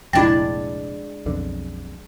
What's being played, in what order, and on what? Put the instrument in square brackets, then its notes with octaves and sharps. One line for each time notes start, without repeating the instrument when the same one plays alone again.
[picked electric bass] F1 A#1 [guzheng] G#3 D4 [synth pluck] E4 A6 [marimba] G5
[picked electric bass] B1 F2 D3